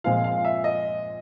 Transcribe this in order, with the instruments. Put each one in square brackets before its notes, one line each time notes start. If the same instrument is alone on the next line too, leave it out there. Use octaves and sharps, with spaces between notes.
[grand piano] A#2 F3 G#3 C4 F4 [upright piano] F5
[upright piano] F5
E5
D#5